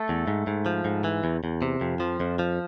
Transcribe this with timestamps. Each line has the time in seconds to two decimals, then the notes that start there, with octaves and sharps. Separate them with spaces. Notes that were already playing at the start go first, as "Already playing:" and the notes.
Already playing: A3 A4
0.09 E2
0.28 G#2
0.47 G#2
0.66 F3
0.85 G#2
1.04 E3
1.24 E2
1.44 E2
1.62 C3
1.81 F2
2.00 F3
2.20 F2
2.39 F3